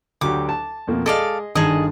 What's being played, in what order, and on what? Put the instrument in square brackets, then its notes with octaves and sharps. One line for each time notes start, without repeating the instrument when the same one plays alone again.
[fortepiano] D2 F#3 G4 [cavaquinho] D6
[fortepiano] A5
[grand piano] F2 B2 A#3
[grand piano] G#3 [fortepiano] G#4 D#5 [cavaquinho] A4 D5 F5
[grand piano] G1 G2 D3 [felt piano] D#3 [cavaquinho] G#4 D#5 [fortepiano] G#5 A5